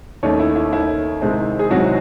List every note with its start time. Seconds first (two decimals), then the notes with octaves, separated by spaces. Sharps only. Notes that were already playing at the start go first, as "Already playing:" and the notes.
0.23 D#2 D#3 A3 C#4 C#5
0.39 E4
0.56 E4
0.72 D#2 D#3 A3 E4
1.21 C2 C3 D#3 G#3 C4
1.59 G#4
1.70 C2 C3 D#3 F#3 G#3 C4 F#4